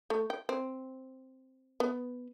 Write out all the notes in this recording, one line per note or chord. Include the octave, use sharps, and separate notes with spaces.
A3
G5
C4
B3